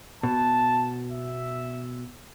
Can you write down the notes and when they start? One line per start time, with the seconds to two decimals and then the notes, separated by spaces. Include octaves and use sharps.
0.23 B2 A5
1.12 E5